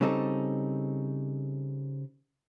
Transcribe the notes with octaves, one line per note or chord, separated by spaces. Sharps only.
C#3 G3 C4 D#4 A4